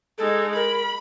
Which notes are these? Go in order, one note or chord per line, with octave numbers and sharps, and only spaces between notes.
G#3 D#4 A4
A#4 B5